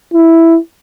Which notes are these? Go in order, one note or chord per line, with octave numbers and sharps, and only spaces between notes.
E4